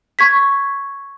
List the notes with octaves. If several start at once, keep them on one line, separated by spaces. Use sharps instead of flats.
C#6 G#6 B6